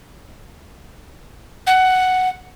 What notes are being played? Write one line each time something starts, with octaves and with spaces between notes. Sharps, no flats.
F#5